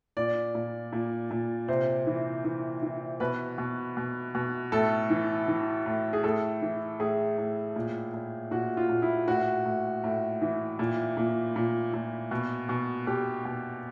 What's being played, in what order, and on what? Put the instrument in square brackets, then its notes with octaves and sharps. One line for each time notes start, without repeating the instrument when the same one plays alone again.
[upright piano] A#2 D5
A#2
A#2
A#2
C3 C5
E3
E3
E3
B2 B4
B2
B2
B2
A2 A4
E3
E3
A2
G#4
A2 A4
E3
A2 G#4
A2
A#2
A#2
A#2 F#4
F4
A#2
E4
A2 F#4
A2
A2
E3
A#2
A#2
A#2
A#2
B2
B2
B2 G4
B2